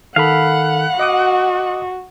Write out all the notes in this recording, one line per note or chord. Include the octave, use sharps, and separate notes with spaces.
D#3 A4 F5 F#5 B5
F#4 D#5 D6 D#6